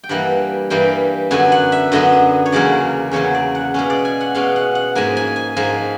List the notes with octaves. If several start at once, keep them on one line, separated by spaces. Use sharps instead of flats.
G5
G2 E3 G3 A#3 F#5
G2 E3 G3 A#3 G5
F#2 D3 F#3 B3 G#5
F#5
E5
F#2 D3 F#3 B3 D#5
C#5
E2 C#3 F#3 A#3 C#4 D5
E2 C#3 F#3 A#3 C#4 C#5
D5
F#5
B2 G#3 C#4 F5
D5
G#5
F#5
B2 G#3 C#4 F5
F#5
F#5
G#2 F3 A#3 G#5
G#5
G#5
G#2 F3 A#3 G#5